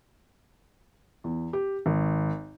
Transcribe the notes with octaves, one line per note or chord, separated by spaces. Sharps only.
E2
G4
G#1